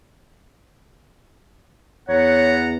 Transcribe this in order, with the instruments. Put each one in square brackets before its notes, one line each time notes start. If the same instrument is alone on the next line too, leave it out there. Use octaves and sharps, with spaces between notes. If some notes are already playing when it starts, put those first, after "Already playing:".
[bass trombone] E2 [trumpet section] B3 F#5 A#5 [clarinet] C#5